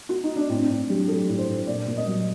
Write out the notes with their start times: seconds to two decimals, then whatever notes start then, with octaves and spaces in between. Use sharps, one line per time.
0.09 F#4
0.23 D#4
0.36 D4
0.49 A2 C4
0.69 A2 D4
0.90 F#3 G4
1.08 F#3 A4
1.29 A2
1.39 C5
1.48 A2
1.67 A#2 D5
1.87 A#2
1.97 D#5
2.07 F#3